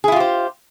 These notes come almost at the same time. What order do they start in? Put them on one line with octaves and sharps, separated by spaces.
G#4 E4 F4 G4 C5